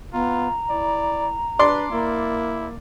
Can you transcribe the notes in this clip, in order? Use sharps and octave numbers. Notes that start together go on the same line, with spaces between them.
B3 F4 A#5
E4 D5
D4 B4 D5 C6
A#3 E4